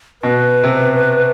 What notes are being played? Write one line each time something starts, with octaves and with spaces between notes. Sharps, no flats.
B2 B4
C3